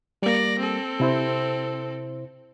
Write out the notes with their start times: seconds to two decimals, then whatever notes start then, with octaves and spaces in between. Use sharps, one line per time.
0.22 G3 A#3 D5 A#6
0.59 C4 A4
1.00 C3 E4 C5